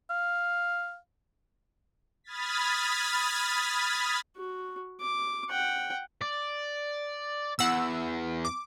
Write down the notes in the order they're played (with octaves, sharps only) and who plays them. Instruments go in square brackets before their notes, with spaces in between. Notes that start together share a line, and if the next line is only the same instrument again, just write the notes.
[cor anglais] F5
[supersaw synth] B5 D#6 F6 G#6 A6 B6
[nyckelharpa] F#4
D6
F#5 G5
[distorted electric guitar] D5
[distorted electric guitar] E2 [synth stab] F#5 E6
[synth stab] D6